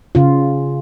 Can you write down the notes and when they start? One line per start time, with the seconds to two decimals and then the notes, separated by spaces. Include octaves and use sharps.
0.15 C#3 F4